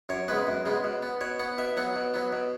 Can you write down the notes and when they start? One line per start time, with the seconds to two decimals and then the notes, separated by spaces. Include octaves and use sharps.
0.09 F#2 C#5
0.28 C#3 G#3 B3 B4
0.47 F#2
0.65 C#3 G#3 B3
0.84 B2
1.03 B3
1.21 B2 C#5
1.39 B3 F#5
1.58 B2 E5
1.77 F#3 B3 F#5
1.96 B2
2.14 F#3 B3
2.32 B2